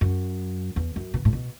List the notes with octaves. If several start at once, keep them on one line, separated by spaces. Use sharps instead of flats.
F#2
E2
F#2
B2
A2
B2